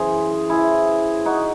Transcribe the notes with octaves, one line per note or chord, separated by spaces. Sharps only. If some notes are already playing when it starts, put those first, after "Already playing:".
Already playing: F#2 C#3 E3 G#4 C5
E4 G#4
D#4 F#4